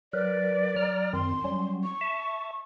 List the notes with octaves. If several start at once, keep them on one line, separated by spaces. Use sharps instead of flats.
F#3 A#4 B4 D5
F#3 A#5 F6
F#2 D#3 C4 C6
F#3 G3 C#4
C#6
E5 A5